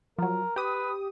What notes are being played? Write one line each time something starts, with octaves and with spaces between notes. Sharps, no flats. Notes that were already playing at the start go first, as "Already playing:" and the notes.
F3 F#3 A#4
G4 B4 D#6